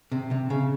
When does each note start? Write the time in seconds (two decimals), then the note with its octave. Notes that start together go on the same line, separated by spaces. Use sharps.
0.12 C3
0.31 C3
0.50 C#3